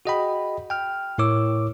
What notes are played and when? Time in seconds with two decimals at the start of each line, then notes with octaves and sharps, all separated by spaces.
0.05 F#4 G#4 D#5 F#5 G5 B5
0.70 G5 F6
1.18 A2 E4 A#4 C#5 D6 E6